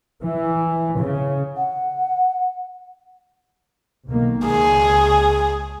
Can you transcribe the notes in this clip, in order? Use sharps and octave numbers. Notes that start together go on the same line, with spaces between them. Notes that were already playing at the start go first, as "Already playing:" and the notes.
E3
C#3
F#5
B1 D#3 A#3
C#2 G#4